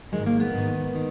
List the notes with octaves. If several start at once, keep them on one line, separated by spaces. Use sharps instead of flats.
G#2 D#3 G#3
A#3
B3
G#2 D#3
D#3